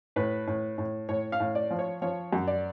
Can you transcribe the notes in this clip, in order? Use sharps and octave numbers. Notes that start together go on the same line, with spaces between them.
A2 B4
A2
A2
A2 C#5
F5
A2
D5
F3
C#5
F3 C#5
F#2
D5